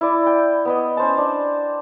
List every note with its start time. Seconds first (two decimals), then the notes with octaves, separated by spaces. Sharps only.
0.01 E4 D5
0.27 G5
0.65 B3 B4 D#5
0.97 C#4 C5 A5
1.18 D4